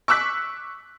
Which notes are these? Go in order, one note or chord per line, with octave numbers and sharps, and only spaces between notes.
C#6 D6 E6 F#6 B6